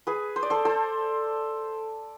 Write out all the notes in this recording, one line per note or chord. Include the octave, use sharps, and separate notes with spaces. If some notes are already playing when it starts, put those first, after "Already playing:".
G#4 B4
C5
D5
A4 C5
A4 C5